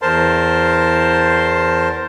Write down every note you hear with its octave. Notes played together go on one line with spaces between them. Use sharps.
E2 A#4 C5 A5 C6